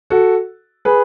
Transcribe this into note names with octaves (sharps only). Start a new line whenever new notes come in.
F#4 A4
G#4 B4